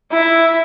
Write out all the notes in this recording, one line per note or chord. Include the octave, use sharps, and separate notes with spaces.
E4